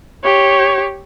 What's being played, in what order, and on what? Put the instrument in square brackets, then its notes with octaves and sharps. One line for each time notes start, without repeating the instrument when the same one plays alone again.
[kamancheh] G4 C#5